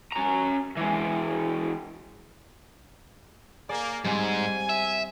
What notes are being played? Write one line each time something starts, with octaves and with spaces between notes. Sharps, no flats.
C#4 A#5
E3 G#3
A#3 G#4 D5
G#2 G3 C4 G#5
E5